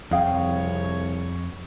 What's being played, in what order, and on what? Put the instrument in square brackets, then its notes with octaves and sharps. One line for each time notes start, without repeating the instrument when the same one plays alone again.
[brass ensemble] C2 C#3 C#5 [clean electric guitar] F2 [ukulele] G#4 F5 G5